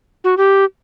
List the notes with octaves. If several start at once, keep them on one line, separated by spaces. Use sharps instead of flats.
F#4
G4